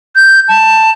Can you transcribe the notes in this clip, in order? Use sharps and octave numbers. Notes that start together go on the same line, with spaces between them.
G6
A5